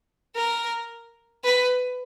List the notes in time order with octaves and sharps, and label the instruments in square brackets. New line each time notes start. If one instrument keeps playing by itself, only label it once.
[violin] A#4
B4